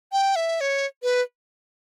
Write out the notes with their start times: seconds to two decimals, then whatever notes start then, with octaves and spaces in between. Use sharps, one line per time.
0.12 G5
0.36 E5
0.61 C#5
1.03 B4